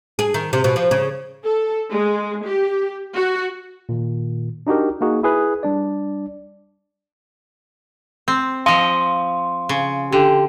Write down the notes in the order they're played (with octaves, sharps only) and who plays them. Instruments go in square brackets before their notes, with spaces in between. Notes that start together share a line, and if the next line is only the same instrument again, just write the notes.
[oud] G#4
D#3
C3
B2
F3
C#3
[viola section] A4
G#3
G4
F#4
[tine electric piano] A#2 D#3
D4 D#4 F#4 G4 A#4
A#3 D#4 F#4 G#4
E4 G#4 B4
G3 D4 D5
[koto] C4
[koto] F3 D#5 [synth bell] F5 C6
[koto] C#3
[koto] D3 [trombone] G4